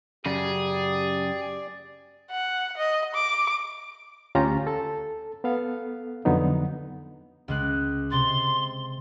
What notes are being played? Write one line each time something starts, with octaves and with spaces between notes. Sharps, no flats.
F#2 C#3 G4 G#4 D5
F#5
D#5
D6
D2 C#4 F4 G4 A#5
A4 A5
B3 A4 F5
F2 D3 F#3 B3 D#4
C#2 G#3 F#6
C3 C6 A6